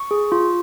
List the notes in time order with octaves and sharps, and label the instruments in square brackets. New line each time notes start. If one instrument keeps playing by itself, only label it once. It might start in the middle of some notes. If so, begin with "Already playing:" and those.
Already playing: [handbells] C#6
G#4
F4